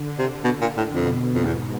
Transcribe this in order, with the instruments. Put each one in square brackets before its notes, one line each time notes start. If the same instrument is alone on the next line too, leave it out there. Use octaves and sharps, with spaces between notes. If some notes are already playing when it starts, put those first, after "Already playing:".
Already playing: [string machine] D3
[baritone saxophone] C3
[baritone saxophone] B2 [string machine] D3
[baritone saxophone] A#2
A2
[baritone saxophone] F2 [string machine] B2
[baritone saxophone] F2
[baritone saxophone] E2 [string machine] G#2